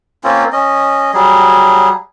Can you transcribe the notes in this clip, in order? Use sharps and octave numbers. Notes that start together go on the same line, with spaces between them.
A#3 C4 C#4 F4
C#4 D#5
F#3 G3 G#4